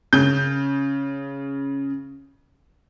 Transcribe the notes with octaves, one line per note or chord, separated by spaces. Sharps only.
C#3 G6